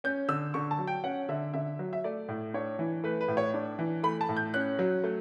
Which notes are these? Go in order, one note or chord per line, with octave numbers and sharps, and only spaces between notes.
C#4 G6
D3 E6
D3 C#6
A5
F#3
G5
C#4 F#5
D3 E5
D3 E5
F#3
E5
A3 D5
A2
D4 C#5
E3
A3 B4
B4
A2
C#5
D4
E3
A3 B5
A5
A2
G6
C#4 F#6
F#3
A3